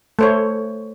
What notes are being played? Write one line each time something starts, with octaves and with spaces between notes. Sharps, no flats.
A3 C5 C#5